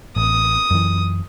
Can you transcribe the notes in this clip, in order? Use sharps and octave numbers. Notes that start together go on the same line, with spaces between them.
A1 D#6
F#2 E3